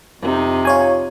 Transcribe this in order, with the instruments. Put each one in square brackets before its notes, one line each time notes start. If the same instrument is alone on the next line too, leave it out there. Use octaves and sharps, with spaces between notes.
[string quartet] F2 C3 D#4
[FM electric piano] F4 C#5 G#5